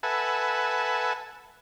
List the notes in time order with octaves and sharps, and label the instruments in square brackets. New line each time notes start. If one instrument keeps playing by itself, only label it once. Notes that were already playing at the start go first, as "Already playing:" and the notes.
[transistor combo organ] A4 B4 E5 F#5 G#5